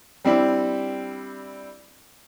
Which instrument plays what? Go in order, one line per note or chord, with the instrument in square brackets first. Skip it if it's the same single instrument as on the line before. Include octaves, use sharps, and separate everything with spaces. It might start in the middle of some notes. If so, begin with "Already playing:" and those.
[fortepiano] G3 C4 D4 E4